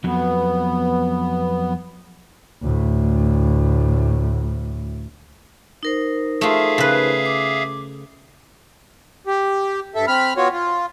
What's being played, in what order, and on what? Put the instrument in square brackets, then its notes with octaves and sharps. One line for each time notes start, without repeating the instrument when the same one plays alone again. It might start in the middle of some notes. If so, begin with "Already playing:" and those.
[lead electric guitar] F2 F#3 [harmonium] B3
[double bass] D2 A2
[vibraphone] D#4 A#4 C5
[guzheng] A3 F4 [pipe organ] G#4 E5 F5
[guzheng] C#3 B4
[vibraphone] D6
[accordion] G4
G2 A4 E5
C4 B5 F6
B3 F4 F#4 C#5
F4